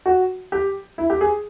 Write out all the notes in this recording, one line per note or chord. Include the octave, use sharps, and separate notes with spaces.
F#4
G4
E4
G4
G#4